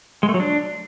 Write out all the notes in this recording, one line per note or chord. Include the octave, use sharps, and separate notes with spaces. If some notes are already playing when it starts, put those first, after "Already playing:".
G#3
A3
F#3
D4